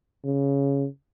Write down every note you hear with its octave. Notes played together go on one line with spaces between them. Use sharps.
C#3